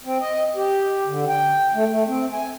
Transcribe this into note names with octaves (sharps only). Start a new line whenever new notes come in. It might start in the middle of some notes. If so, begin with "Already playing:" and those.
C4
D#5
G4
D3
G5
A3
A3
C4
G#5